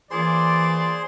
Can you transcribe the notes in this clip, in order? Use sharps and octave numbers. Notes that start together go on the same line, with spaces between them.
A#2 E3 F4 G#4 C5 D5 C6